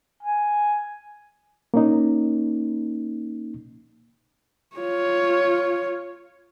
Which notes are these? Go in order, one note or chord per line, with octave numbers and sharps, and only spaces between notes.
G#5
A#3 C#4 D#4
F4 C#5